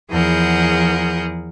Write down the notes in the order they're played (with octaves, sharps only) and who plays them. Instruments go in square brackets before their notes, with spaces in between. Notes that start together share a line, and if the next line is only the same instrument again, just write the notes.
[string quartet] E2 F3 G#4 A#4 F#5 G6